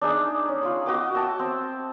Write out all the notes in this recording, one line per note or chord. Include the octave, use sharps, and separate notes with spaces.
D4 D#4 G#4 E5
C#4
F4 B5
F#4 D#5 G5 D6
E5 G5 A5 E6
C4